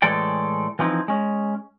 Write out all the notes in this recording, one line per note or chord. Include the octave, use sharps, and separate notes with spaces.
A2 E3 G#3 A4 D5 G5
E3 F3 C4 D#4 E4
G#3 C#4